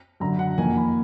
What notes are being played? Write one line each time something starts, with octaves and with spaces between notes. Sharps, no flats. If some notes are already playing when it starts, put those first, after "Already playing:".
F#2 D3 F#3 A#5
F#5
F2 D#3 A#3 G#5
B5